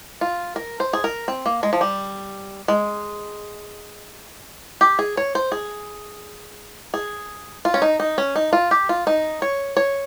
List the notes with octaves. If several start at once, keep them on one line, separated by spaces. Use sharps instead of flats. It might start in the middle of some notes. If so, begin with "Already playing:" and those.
F4
A#4
C5
G#4
A#4
C4
A#3
G#3
F3
G3
G#3
G4
G#4
C#5
C5
G#4
G#4
F4
C#4
D#4
D#4
C#4
D#4
F4
G4
F4
D#4
C#5
C#5